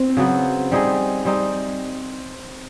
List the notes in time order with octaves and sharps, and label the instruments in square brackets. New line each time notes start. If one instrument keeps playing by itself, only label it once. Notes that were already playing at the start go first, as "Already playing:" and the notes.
Already playing: [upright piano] C4
[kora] C#3 F#3 B3
G3 C4 D#4 G#4
G3 C4 D#4 G#4